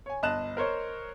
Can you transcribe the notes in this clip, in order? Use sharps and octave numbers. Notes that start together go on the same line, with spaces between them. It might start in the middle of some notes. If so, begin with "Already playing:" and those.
C#5 G#5
G1 D#5 A5 F#6 E7
A#4 C5 C#5 D#5